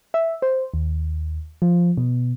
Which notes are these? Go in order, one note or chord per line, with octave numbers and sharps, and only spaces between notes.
E5
C5
D#2
F3
B2